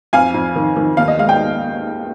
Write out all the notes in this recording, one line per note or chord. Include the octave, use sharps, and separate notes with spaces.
F2 F5 G#5
F2
D#3
D#3
D#2 F5
D#5
G#3 F5
G5